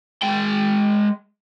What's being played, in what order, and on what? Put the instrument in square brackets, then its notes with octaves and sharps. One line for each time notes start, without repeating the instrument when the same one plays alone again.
[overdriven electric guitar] G#3 G5